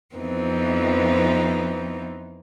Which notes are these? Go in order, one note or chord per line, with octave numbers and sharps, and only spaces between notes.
F2 E3 F3 B3 C4 D#4